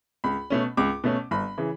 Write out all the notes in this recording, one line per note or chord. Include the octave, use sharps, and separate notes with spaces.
C#2 B5
B2 A3 C#4
C#2 D6
B2 A3 C#4
G1 B5
C#3 E3